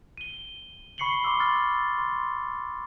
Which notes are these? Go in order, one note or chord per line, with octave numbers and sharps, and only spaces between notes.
D#7 G7
B5 C#6 C7 C#7 F#7 G7
B5 C6 D6 E6 G7
E6 F6 A6
C6